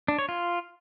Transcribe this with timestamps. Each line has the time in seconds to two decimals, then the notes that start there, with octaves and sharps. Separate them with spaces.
0.08 D4
0.19 C#5
0.29 F4